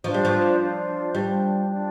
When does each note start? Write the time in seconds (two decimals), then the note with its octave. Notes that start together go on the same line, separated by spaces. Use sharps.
0.04 F3 D4 F4 C5
0.14 G3
0.25 F3
0.59 D4 F4 C5
1.14 G3 D4 F4 C5
1.69 D4 F4 C5